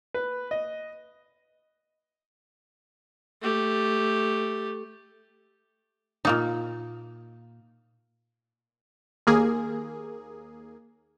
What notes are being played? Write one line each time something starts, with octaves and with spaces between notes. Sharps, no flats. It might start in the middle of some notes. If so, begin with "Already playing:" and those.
B4
D#5
A3 G4
A#2 A#3 D#4
D#2 A#3 G#4